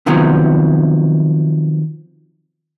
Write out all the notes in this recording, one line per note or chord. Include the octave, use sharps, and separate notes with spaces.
C3 D#3 F3 F#3 B3